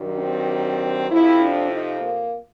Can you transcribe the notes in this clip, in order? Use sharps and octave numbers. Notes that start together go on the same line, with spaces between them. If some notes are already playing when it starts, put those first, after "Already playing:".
Already playing: G2 D#3 F#3
C4
F2 C3 F3 E4
D4
D#4
A#3